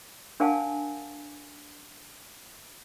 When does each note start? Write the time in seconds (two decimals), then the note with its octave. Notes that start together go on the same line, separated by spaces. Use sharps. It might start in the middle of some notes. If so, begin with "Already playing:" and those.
0.40 D4 A#4 F5 F#5 G#5 A5